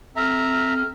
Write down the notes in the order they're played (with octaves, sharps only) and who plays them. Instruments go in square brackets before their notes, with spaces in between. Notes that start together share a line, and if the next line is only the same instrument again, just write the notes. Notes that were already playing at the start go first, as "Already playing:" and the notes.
[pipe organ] C4 A4 [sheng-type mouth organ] E5 A#5 [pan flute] F6